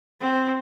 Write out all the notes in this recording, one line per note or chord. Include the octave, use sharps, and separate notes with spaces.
C4